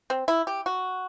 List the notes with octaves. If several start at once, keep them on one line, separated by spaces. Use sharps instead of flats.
C4
E4
G4
F#4